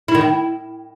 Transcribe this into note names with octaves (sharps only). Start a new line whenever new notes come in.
E4
D#3
E4